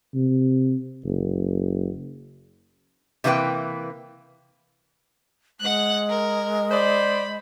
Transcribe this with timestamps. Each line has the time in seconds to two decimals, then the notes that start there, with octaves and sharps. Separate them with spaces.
0.14 C3
1.05 F#1
3.24 C3 E3 A#3 B4 G5
5.60 G#3 F#5 F#6
6.09 A#4
6.71 C5 D5 B5